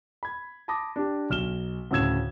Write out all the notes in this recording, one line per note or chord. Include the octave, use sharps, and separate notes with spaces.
B5 G#6
A5 B5 D6 D#6 A#6
D4 G4
B1 F6 E7 G7
D2 A2 C#3 E6 G#6 E7